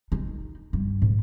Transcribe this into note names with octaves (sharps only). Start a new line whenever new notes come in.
D#4
G2
G#2